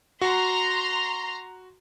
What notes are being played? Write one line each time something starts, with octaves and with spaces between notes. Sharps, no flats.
F#4 A#5 C6